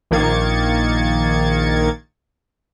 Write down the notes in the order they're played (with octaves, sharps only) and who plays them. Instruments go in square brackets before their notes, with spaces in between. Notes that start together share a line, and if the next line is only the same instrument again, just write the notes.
[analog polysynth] A#1 D#3 A#3 G#6 A6 C#7